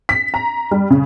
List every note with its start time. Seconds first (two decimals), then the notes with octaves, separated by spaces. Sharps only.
0.09 B6
0.34 A#5
0.71 G3
0.90 C#3